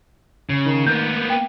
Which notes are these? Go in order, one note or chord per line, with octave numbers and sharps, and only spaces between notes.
C#3
D#3
A#3 B3 G6
G5